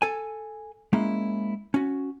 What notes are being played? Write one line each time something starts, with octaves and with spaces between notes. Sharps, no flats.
A4 G#5
G#3 A#3 C#4 E4
C#4 F#4